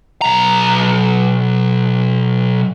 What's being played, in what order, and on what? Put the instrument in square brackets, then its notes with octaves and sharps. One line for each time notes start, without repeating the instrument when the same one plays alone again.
[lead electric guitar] B1 A#5